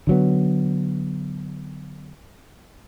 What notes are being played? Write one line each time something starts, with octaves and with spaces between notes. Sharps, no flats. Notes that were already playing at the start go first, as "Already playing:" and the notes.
D3 F#3 B3